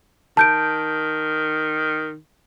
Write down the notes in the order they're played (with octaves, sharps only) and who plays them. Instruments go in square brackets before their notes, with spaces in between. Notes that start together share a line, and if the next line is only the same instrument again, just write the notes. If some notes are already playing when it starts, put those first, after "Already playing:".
[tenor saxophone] D#3 [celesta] A5 G6 D7